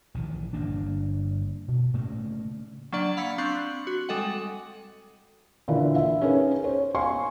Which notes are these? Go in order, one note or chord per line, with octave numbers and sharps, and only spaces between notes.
A#1 D#3 E3
G1 A#3 D4
B2
A2 C#3 A3 A#3
F#3 A#3 D4 D5 F#5
F5 B5 E6 G#6 B6 C#7
C4 D4 C#6 F#6 C7 F#7
F#4 F#7
G3 G#3 A4 D#5 F#5
A#2 D3 E3 A#3
E5
C#4 D#4 G#4 A#4 B4
C5 C#5
F5 G#5 C6 C#6